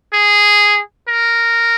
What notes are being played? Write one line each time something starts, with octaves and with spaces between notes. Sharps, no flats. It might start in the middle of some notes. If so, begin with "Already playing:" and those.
G#4
A#4